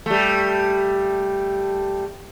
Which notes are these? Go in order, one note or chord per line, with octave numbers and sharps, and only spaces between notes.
G3 A3